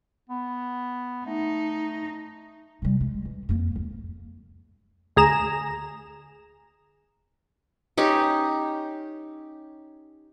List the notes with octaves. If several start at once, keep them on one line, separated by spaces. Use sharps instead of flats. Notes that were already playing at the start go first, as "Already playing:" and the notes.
B3
A3 D#4
C3 G3
G#3
E3
F2 A#3
C#2
D2 G#4 A#5 E7
C#4 D#4 G4